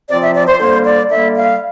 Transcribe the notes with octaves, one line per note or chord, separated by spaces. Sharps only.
C3 F3 C4 F4 D5
E5
D5
C5
D3 G3 A#3 C5
D5
D3 G3 A#3 E5
F5